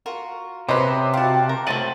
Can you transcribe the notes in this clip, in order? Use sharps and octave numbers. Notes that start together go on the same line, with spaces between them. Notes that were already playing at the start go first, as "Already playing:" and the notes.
F4 F#4 A#4
C3 B3 C#4 B4 C5 D#5
F#4 G4 F5 A5
A#4
F#3 A3 C4 A6 D#7 F#7